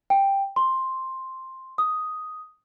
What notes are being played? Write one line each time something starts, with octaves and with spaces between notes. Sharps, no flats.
G5
C6
D#6